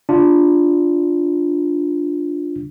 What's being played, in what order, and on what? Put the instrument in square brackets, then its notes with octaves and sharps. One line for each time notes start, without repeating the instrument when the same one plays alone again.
[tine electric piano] D4 F4